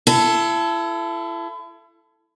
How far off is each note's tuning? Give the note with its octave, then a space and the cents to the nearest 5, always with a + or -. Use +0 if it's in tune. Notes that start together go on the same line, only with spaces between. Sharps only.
E4 +35 A4 +0